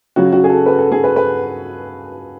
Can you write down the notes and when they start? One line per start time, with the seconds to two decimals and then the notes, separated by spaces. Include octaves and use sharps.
0.16 C#3 F#3 F#4
0.33 F#4
0.44 G#4
0.50 A4
0.66 B4
0.78 A4
0.92 G#4
1.04 B4
1.16 B4